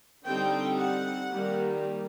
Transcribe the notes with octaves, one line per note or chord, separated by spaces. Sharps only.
D3 G3 C4 D#4 G5
F#5
D#3 G3 A#3